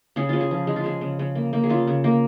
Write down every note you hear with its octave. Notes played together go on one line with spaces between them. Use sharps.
C#3 G#4
C#3 F4
G#4
F3
G#3 G#4
F4
C#3 G#4
C#3
C#3
A#3
A#3
G#4
C#3 F4
C#3
A#3